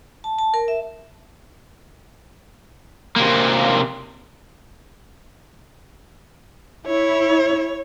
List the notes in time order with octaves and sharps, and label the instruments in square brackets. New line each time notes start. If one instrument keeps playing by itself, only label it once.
[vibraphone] A5
A5
A#4
E5
[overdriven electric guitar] C3 A#3
[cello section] E4 [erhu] C#5